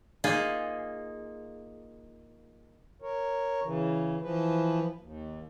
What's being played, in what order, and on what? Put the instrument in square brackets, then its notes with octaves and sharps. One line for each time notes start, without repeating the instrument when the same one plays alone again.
[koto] A#3 D#4 F4 G#4
[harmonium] A#4 C#5
C#3 E3
E3 F3 B4
D#2